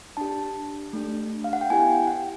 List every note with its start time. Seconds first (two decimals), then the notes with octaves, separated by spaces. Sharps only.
0.17 D4 G4 A5
0.93 A3 D4 G4
1.44 F5
1.53 F#5
1.61 G5
1.70 B3 E4 G4 G#5
1.89 G5
2.07 F#5